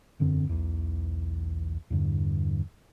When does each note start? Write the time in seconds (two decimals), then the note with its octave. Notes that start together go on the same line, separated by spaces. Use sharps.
0.20 E1 F#2 D3 C4
0.49 B1 E2
1.90 E2 G2 D3